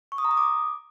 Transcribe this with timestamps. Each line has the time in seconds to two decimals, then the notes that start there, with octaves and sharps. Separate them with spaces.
0.12 C#6
0.18 D#6
0.25 A#5
0.31 D#6
0.37 D6